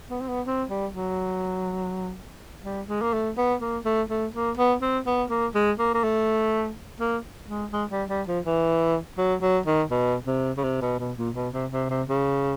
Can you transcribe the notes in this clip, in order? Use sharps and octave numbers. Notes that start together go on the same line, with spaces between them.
B3
C4
B3
C4
G3
F#3
G3
G#3
A#3
A3
B3
A#3
A3
A3
A#3
B3
C4
B3
A#3
G#3
A#3
A#3
A3
A#3
G#3
G#3
G3
G3
F3
E3
F#3
F#3
D#3
B2
C3
C#3
C3
B2
B2
A#2
B2
C3
C3
C3
C#3